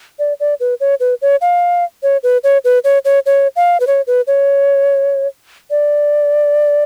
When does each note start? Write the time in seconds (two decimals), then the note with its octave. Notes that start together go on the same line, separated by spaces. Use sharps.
0.19 D5
0.40 D5
0.60 B4
0.80 C#5
1.00 B4
1.22 C#5
1.41 F5
2.03 C#5
2.23 B4
2.44 C#5
2.65 B4
2.84 C#5
3.05 C#5
3.26 C#5
3.56 F5
3.80 B4
3.87 C#5
4.07 B4
4.27 C#5
5.70 D5